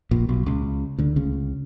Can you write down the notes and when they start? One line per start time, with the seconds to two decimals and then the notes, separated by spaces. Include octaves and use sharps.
0.11 A#1 A#2
0.29 B1 B2
0.46 C#2 C#3
0.99 D2 D3
1.16 C#2 C#3